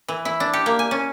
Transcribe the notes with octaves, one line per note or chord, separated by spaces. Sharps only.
E3
E4
D4
G4
A#3
G#5
C#4